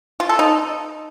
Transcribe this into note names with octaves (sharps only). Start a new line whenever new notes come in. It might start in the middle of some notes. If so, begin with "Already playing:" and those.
F4
A4
D#4